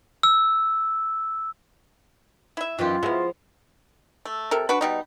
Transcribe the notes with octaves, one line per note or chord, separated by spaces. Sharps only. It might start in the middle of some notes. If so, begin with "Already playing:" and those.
E6
E4 E5
F#2 D#3 E3 F#3 F4 G4
F3 F#3 G#3 B3 E4
A3
C3 A4 A#4
D4 F#4 B4
B2 G3 D#4